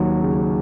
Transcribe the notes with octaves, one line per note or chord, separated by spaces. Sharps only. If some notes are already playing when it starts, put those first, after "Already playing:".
Already playing: D#2 F#3
C#3